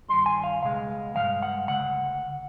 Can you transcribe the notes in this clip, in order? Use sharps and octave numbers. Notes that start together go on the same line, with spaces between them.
G2 D#3 G3 C6
G#5
F5
C#2 B2 G#3 F5
G2 E3 G#3 F5
F#5
D2 C#3 F#5